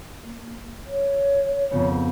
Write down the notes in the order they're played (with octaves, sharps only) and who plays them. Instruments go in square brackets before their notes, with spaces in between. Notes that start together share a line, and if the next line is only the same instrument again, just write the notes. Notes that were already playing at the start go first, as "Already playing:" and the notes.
[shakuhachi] A#3
C#5
[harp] F2 C#3 B3